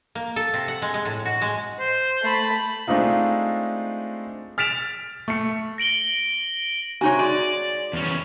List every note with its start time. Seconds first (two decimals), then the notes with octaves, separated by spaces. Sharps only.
0.15 A#3
0.36 A4
0.54 C3
0.68 F#5
0.82 G#3
0.94 G#3
1.05 A2
1.25 F#4
1.42 G#3
1.80 C5
2.21 A3 B5
2.87 G#3 A3 C4 D4 D#4 F4
4.58 F6 A6 B6 D7 E7 F7
5.28 A3 C#7
5.78 A#6 D7 F#7 G7
7.01 C3 D#4 F#4 C#5 G#5
7.20 G#3 D5
7.93 E2 C#4